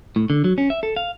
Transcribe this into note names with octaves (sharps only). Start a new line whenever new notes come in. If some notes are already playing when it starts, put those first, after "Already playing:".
A2
D3
F#3
C#4
E5
A4
F5